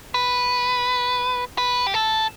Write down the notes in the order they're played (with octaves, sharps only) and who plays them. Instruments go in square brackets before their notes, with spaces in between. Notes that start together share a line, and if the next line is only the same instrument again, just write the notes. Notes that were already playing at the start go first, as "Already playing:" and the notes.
[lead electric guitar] B4
B4
G4
A4